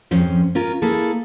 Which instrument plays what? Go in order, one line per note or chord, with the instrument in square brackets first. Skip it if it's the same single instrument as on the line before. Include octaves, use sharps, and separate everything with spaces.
[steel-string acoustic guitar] F2 G#2 F3 C#4 C5
C#4 F4 A#4
A#3 E4 G#4 A4